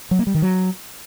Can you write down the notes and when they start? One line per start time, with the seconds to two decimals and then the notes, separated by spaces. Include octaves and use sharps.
0.11 F#3
0.19 A#3
0.27 G3
0.34 D#3
0.42 F#3